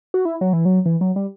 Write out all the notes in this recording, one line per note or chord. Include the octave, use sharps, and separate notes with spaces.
F#4
E4
F#3
E3
F#3
E3
F#3
G3